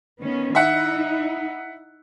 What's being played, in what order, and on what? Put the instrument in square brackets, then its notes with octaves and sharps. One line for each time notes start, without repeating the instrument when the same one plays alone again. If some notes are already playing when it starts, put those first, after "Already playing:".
[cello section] D#3 B3 C#4
[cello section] D#4 E4 [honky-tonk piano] E5 F#5